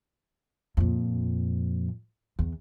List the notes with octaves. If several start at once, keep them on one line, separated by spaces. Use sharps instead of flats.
F2 A#2
E2